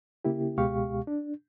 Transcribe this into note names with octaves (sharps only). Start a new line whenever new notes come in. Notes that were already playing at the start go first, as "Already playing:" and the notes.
C#3 A#3 E4 G4
C#2 B2 G#3 G4 F5 C#6
D4